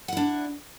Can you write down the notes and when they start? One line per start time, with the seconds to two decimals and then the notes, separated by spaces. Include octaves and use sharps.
0.08 F#5
0.13 E4
0.17 D4